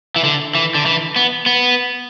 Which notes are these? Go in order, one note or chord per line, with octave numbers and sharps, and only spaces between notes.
E3
D3
E3
D3
E3
B3
B3